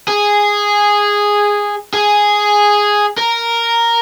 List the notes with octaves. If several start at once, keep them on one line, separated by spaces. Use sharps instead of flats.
G#4
G#4
A#4